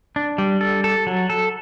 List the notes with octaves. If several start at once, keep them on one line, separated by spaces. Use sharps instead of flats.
D4
G3
A4
A4
F#3
A4